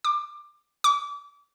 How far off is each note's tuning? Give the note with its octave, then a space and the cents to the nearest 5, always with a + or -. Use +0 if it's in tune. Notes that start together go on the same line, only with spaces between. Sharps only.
D6 +20
D6 -30